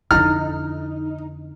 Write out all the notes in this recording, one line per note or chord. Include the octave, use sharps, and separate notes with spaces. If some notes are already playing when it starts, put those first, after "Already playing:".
F2 D3 D#4 E4 F6